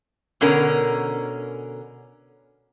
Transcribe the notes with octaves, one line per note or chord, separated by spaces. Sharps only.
B2 D3 C#4 A#4